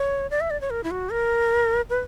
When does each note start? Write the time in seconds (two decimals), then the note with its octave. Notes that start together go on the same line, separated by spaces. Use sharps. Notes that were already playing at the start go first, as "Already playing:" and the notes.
Already playing: C#5
0.31 D5
0.41 E5
0.50 D5
0.61 C#5
0.70 A#4
0.84 E4
0.91 F#4
1.10 A#4
1.90 B4